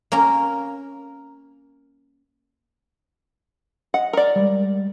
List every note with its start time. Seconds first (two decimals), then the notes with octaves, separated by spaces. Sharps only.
0.12 A#3 C#4 A#4
3.94 D#5 F#5
4.13 A#4 D5
4.36 G3 G#3